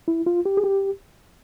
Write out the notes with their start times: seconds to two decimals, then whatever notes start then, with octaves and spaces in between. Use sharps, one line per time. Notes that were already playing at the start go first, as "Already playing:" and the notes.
0.08 E4
0.26 F4
0.46 G4
0.57 G#4
0.64 G4